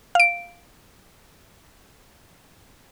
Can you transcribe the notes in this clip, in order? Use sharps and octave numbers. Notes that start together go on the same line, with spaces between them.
F5 D7